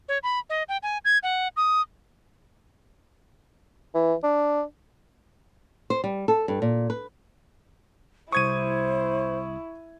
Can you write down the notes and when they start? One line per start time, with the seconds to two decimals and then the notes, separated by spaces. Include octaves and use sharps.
0.09 C#5
0.23 B5
0.50 D#5
0.69 G5
0.83 G#5
1.05 G#6
1.23 F#5
1.57 D#6
3.94 E3
4.24 D4
5.90 C5
6.04 G3
6.28 A4
6.48 G2
6.62 A#2
6.90 B4
8.32 C2 E4 C5 C#6 D#6 G#6 D#7